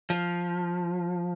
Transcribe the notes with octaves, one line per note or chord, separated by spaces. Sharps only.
F3